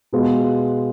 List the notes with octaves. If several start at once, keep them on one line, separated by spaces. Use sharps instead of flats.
B2 G#3 B3 F4